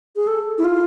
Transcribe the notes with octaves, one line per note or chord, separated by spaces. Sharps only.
G#4
A4
E4
F4